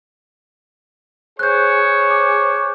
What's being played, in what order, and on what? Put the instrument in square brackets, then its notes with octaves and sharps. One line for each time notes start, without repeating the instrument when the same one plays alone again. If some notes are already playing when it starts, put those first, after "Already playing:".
[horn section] G#4 C5 C#5 [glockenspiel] F#6 G6
[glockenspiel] D6